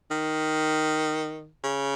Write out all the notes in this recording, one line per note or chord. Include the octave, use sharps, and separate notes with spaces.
D#3
C#3